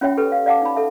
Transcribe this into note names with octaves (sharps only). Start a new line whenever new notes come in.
C#4 F4 F#4 C#5 E5 G5
G4 A4 B4
F5
D5 F5 F#5 A5 D6
D#4 B5
A4 E5